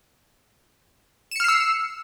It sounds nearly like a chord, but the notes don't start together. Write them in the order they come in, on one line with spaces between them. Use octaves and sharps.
E7 C#7 F6 C7 E6